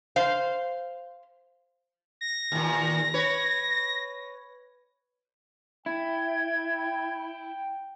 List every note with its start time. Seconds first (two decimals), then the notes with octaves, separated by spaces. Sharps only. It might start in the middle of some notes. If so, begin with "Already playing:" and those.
0.16 C5 F5
2.21 A#6
2.52 D#2 A#2
3.14 B4 C#5
5.86 E4 G5 G#6